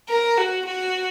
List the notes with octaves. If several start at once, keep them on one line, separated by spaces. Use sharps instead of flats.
A#4
F#4
F#4